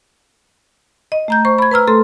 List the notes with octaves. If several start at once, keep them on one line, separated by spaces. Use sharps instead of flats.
D#5
A3 A#5 G6
C5 C#6
B5 G#6
B4 A#5 E6 F6
A3 A4 C6